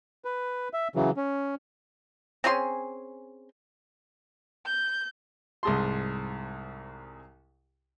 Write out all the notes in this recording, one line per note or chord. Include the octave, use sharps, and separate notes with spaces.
B4
E5
C#3 E3 F#3
C#4
C4 C#4 G#4 C6
G6
C2 G#2 G#4 A5 C6